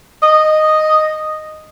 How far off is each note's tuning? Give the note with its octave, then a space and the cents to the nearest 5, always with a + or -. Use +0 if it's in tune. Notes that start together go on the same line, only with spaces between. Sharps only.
D#5 -5